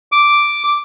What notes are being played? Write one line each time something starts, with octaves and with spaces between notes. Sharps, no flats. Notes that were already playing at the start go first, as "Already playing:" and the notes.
D6